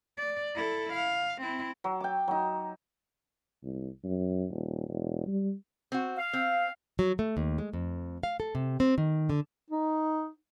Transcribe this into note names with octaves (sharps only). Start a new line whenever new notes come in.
D5
E4 A4
F5
C4 E4
F#3
G5 D6
F#3 D#4
C2
F#2
D#1
E1
G3
C4 F#4
F5
C4
F#3
A3
D#2
G#3
F2
F5
A4
C3
C4
D#3
D3
D#4